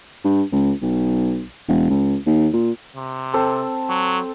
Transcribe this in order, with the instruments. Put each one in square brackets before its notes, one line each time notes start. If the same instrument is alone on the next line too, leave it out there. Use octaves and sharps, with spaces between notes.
[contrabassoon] G2
C#2
B1
E1
C#2
D#2
A#2
[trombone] C3
[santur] C4 A4 C5
[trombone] F#3